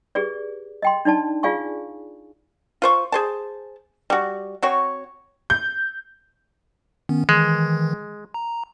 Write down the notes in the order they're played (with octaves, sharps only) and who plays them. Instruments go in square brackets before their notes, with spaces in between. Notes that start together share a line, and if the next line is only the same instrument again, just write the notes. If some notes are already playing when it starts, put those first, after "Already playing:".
[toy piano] G4 G#4 B4 D5
D#5 G5 C6
D4 D#4 D5 A5
F4 G#4 D5 F5 G#5 C#6
[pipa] F4 C5 C#6
G#4 C5 A5
G3 F#4
C4 F#4 C#5
[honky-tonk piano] G6
[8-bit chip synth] D#3 B3 C#4
[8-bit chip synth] D#3 E3 [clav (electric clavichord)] G#3
[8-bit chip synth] A#5